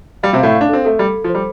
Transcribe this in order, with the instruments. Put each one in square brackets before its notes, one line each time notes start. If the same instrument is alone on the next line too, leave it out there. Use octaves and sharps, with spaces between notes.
[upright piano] G3 [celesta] F5
[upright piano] C3 C4
[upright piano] A2 A3 [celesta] F5
[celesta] F5
[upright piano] D4
[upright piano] C4 [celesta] A4
[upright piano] A3 [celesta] A4
[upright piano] G3 [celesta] A4
[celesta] A4
[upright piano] F3
[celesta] C5
[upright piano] G3